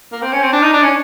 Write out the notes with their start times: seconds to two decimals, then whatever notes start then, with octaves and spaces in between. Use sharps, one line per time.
0.12 A#3
0.22 C4
0.33 C#4
0.43 C4
0.53 D4
0.63 D#4
0.73 D4
0.83 C#4